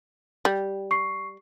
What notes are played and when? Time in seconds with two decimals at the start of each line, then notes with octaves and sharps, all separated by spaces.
0.45 G3
0.91 C#6 C7